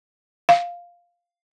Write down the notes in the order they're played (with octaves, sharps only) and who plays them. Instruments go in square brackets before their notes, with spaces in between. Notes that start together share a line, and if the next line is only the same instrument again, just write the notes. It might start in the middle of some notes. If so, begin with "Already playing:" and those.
[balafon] F5